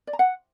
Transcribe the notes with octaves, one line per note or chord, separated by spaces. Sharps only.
D5
A#5
F#5